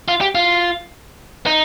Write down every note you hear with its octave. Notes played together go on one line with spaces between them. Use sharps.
F4
G4
F4
D#4